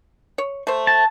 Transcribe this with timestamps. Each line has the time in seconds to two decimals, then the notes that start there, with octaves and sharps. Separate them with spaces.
0.38 C#5
0.67 A3 C5
0.87 A5